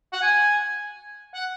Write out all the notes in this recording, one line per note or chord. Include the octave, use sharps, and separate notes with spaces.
F#5
G#5
F#5